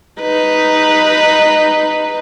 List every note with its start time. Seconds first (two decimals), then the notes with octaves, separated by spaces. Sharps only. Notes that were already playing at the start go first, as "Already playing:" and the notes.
0.21 D#4 B4